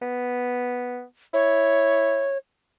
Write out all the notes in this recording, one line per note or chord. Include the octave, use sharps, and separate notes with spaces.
B3
E4 C#5